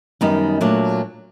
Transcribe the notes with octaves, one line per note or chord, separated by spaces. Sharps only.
F#2 D#3 G3 B3 D#4
A#2 F#3 A3 D4